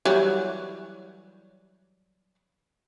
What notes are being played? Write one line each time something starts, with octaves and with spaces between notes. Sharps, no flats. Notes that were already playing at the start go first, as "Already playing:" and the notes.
E3 F#3 G3